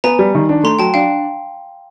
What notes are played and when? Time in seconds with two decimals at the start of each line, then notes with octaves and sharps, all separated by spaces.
0.04 B3 G#5 A#5
0.19 G3
0.35 D#3
0.49 D4
0.64 A3 A#5 C6
0.79 F#3 G5 A5
0.94 D4 F5 G5